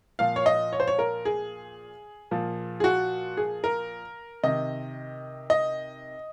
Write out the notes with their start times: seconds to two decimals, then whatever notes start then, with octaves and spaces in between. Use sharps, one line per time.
0.19 A#2 F3 F5
0.36 C#5
0.46 D#5
0.73 C#5
0.80 C5
0.87 C#5
0.99 A#4
1.25 G#4
2.31 A#2 F3
2.80 G#4
2.84 F#4
3.37 G#4
3.64 A#4
4.44 C3 D#3 D#5
5.50 D#5